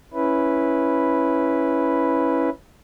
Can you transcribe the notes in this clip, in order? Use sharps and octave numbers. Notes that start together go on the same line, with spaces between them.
C#4 E4 B4